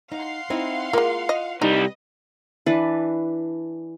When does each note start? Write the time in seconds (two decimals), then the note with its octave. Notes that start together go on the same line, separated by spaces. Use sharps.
0.12 D#4 F5 F#5 C6
0.50 C4 D#4 E4
0.93 G#3 A#3 F4 A#4
1.29 D#5
1.62 C2 G3 D#4 B4 D#5
2.66 E3 D4 B4